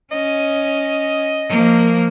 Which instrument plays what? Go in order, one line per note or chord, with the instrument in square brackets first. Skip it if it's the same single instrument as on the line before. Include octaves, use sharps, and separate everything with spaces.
[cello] C#4 [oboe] D#5
[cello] F3 A#3